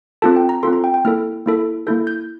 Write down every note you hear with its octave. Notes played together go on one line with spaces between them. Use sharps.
C4 F4 A4 A5
G5
A#5
C4 F4 A4 C6
A#5
G5
G5
A#3 E4 A4 F6
A#3 E4 A4
A#3 E4 A4 G6
G6